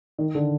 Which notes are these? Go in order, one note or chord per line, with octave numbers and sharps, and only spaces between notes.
D#3
D3